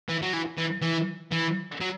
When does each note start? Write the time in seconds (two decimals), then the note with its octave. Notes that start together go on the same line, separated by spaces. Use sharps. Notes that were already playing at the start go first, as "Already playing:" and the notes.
0.09 E3
0.22 F#3
0.34 E3
0.58 E3
0.82 E3
1.31 E3
1.81 F#3